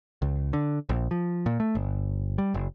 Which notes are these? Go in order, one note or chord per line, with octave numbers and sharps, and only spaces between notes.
C#2
D3
A#1
F3
A#2
A3
G1
G3
F#1